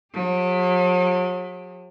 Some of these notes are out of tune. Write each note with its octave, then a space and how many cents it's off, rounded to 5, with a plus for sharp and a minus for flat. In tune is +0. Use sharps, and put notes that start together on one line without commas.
F#3 -40 G4 +45